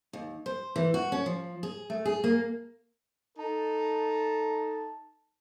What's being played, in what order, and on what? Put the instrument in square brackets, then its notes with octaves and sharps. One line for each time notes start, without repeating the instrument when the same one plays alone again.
[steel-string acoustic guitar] D#2
C5
E3
F#4
C#4
F3
G#4
A3
G#4
A#3
[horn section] D#4 A4 A5